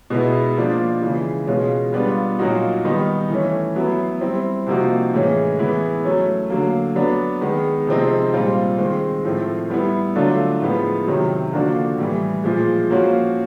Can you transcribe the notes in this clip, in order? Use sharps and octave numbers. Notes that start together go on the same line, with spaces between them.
B2 G#3 B3 E4
F3 A#3 D4 F4
C#3 E3 G#3
B2 G#3 C#4 F4
G3 B3 D4 F4
A#2 F#3 A#3 D#4 F#4
D#3 G3 B3 D#4
E3 A3 C#4
F#3 B3 E4
G3 C4 E4
C3 F3 A#3 D#4 F#4
A2 E3 G#3 C#4
E3 G#3 B3 E4
F#3 A3 C#4
D3 F#3 A#3
F#3 B3 D4
D#3 G#3 B3
C3 F3 G#3 C4 D#4
A#2 G3 C4 F4
D#3 G#3 C4
A2 F3 A3 C4
G3 B3 E4
D3 F#3 A3 D4 F4
A2 F3 G#3 B3
C3 D#3 F#3
D3 F3 A#3 D4 F#4
A2 E3 G3
A#2 F3 G#3
F3 A#3 C#4 F#4